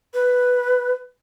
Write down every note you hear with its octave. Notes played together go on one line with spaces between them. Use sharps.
B4